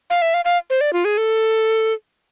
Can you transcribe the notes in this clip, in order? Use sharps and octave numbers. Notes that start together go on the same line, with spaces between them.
F5
E5
F5
F5
C5
D5
F4
G#4
A4